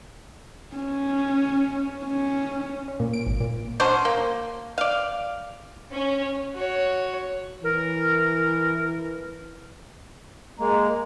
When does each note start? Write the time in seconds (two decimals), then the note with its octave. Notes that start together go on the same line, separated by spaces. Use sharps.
0.76 C#4
2.05 C#4
2.88 C#4
3.00 A#2
3.13 D7
3.26 G#1
3.40 A#2
3.80 F#3 C#4 D4 C5
4.05 A#3
4.78 D5 F5
5.92 C#4
6.55 F#4 C#5
7.64 E3 A#4
10.59 G#3 A#3 A#5